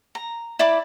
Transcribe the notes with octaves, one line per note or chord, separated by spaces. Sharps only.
A#5
E4 D5 B5 D6